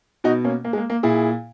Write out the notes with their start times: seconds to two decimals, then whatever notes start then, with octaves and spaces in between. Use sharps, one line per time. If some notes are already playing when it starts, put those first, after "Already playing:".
0.24 B2 D#4 F#4
0.44 A#3 C#4
0.65 A#3
0.73 G#3
0.78 A#3
0.90 A#3
1.03 A#2 E4 G#4